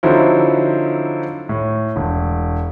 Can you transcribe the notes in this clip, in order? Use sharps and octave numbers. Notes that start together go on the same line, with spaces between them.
D3 F3 F#3 C4 D#4 E4
A2
E1